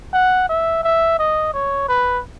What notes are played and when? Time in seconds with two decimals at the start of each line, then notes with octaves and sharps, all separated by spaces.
0.14 F#5
0.49 E5
0.84 E5
1.19 D#5
1.54 C#5
1.89 B4